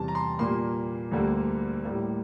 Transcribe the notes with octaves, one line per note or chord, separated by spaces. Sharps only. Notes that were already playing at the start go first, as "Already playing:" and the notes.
Already playing: E2 C3 G3 A5
A#5
C6
A#2 G3 A#3 C6
D2 D3 G3 A#3
A2 G3 A#3